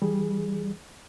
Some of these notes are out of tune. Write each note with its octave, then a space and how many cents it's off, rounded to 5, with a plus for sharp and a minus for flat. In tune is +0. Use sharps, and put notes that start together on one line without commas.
E3 +0 G3 +0 G#4 +0